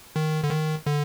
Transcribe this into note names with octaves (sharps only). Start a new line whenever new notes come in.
D#3
D3
D#3
D3